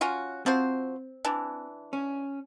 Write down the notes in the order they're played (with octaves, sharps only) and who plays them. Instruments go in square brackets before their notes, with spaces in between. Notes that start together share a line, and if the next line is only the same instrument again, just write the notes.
[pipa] C#4 F4 F#4
[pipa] F3 F#4 C5 [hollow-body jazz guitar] C4
[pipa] E3 D4
[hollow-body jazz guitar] C#4